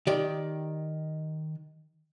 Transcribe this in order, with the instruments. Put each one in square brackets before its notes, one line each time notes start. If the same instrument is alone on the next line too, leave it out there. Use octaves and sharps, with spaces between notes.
[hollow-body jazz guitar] D#3 G4 D5